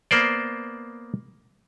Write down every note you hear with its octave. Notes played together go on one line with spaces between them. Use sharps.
A#3 B3 C5 D5